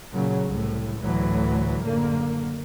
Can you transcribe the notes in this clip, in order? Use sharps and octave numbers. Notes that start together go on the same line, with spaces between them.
A#2 C#3 F#3
C2 A2
D2 A2 E3 F#3
F#1 D3 A#3